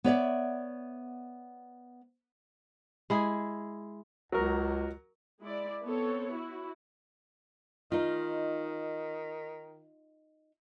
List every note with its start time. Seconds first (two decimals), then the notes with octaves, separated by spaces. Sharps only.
0.04 B3 C#5 D5 E5
3.10 G#3 E4 G#4
4.32 C#2 F#3 A#4
5.42 G#3 E4 D5
5.84 B3 C4 A4 C#5
6.31 E4 F#4
7.92 D#3 D#4 F4